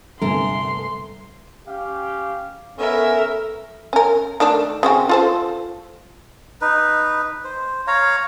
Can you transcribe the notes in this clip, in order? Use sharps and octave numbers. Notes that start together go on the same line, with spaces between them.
G1 C3 A3 A#4 G#5 C6
C#4 G4 F5
B3 C#4 A4 A#4 E5
C#4 A#4
D#3 A3 D4
C#3 C4 F#4
F4 A4 C5
D#4 B4
C5
C#5 F5 A#5